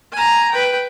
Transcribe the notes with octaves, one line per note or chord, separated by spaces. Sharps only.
G#5 A#5
B4 G5